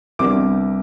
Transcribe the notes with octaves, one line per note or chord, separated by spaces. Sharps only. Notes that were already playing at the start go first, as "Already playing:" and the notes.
C2 C3 G3 B3 D4 D6